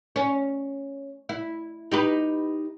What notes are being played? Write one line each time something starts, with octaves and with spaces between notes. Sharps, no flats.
C#4
E4
D#4 G4 B4